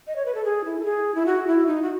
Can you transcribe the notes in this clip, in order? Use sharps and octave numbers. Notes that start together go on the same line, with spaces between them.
D#5
C#5
B4
A4
G#4
E4
A4
G#4
E4
F#4
E4
D#4
F#4